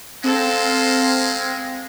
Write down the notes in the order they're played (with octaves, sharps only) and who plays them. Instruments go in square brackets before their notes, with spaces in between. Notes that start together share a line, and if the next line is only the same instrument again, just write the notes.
[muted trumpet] G#3 [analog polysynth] C4 [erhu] A4 [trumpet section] F5